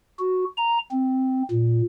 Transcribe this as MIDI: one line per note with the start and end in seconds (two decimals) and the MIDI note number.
0.19 0.45 66
0.57 0.78 82
0.91 1.43 60
1.51 1.81 46